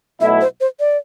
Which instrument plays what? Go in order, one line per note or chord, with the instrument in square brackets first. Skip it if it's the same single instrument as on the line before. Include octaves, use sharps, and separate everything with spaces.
[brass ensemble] B1 B2 A3 E4 [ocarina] E5
[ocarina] C5
C5
D5